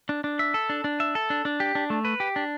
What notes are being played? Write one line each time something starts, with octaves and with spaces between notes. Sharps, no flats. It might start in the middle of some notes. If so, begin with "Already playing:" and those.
D4
D4
E5
A4
D4
D4
E5
A4
D4
D4
G4
D4
A3
B4
G4
D4